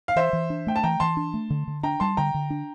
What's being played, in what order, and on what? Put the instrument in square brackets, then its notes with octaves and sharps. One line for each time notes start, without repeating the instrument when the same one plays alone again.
[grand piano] F5
[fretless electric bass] E3 [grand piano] C5 E5
[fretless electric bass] E3
D4
[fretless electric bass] A3 [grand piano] G5
[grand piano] A5
[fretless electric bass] E3 [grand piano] G5 A#5
[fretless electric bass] E3 [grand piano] A5 C6
[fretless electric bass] D4
A3
D3
D3
[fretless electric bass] D4 [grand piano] G5 A#5
[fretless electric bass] G3 [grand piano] A5 C6
[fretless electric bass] D3 [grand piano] G5 A#5
[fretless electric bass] D3
D4